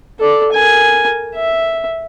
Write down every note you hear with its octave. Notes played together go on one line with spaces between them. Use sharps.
A4 D5
A#4 G#5
E5